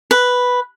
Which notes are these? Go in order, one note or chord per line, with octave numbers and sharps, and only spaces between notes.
B4